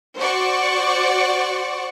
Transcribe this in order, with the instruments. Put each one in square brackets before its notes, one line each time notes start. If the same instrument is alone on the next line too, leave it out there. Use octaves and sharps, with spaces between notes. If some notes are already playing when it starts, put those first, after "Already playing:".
[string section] F#4 C5 D5 F#5 C#6